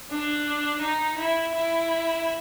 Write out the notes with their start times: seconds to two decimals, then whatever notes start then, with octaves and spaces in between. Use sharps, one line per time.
0.11 D4
0.82 D#4
1.19 E4
1.54 E4